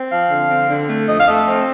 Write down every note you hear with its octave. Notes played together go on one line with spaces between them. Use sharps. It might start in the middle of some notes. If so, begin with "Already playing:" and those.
Already playing: C4
F3 F5
D3
C4
D3
A3
F2 D#5
F5
A3 D#5
C4